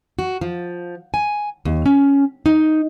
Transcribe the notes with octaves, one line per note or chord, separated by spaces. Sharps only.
F#4
F3
G#5
D#2
C#4
D#4